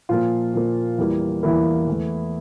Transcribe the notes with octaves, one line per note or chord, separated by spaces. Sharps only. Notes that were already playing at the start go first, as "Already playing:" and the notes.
A#2 F3 A#3 F4
A#2 F3 A#3
E2 E3 G3 A#3
E2 E3 G3 A#3 E4
E2 E3 A3